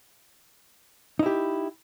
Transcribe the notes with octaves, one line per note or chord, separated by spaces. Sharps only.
D#4 E4 G4